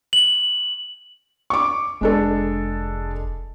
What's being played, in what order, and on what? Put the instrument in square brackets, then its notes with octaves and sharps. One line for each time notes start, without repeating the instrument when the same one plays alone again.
[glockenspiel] F#7
[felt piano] C#6 D6
[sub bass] F1 [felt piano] G#3 D4 A4